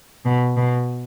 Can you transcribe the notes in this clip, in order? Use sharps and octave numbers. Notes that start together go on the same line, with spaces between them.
B2
B2